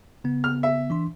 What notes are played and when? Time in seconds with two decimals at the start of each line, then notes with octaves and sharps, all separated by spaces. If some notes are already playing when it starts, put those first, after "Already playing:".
0.24 C#3 B3
0.44 F6
0.63 E5
0.90 E3 D4 C6